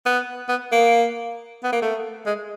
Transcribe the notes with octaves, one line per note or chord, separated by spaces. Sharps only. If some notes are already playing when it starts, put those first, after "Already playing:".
B3
B3
A#3
B3
A#3
A3
G#3